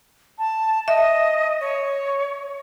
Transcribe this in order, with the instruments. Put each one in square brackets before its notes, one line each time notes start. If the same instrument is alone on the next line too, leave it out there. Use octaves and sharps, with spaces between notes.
[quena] A5
[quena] D#5 [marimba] E5
[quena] C#5